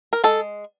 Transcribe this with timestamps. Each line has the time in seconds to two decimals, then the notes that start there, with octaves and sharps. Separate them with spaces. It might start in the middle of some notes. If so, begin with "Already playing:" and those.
0.13 A#4
0.24 G#3 A4